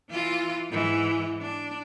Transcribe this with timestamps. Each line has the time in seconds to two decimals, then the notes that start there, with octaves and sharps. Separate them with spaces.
0.11 E3 F4
0.70 G#2 E3
1.41 D4